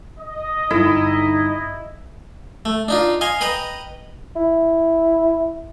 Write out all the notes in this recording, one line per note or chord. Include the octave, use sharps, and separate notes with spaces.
D#5
G2 D3 D#4 E4 A4
A3
D4 D#4 F4
D#5 F5 G#5 C6
B4 D#5 G5 A#5
E4